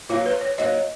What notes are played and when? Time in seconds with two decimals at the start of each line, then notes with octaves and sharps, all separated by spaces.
0.09 F#3 A#3 D#4 F4
0.26 B4
0.41 C#5
0.58 F#3 A#3 D#4 D#5